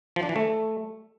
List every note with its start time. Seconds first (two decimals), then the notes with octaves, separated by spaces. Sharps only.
0.16 F3
0.23 D4
0.29 E3
0.36 A3